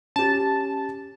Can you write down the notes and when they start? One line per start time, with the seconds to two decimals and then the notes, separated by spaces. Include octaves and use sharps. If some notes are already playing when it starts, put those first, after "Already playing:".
0.16 C#4 G4 A5